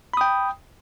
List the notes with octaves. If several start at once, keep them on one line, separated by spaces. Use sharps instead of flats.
G5 B5 D#6